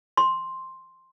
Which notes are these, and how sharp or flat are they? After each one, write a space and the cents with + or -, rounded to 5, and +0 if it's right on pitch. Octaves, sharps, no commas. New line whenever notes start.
C6 +5